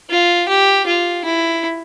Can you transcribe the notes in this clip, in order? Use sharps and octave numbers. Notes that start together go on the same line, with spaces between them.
F4
G4
F4
E4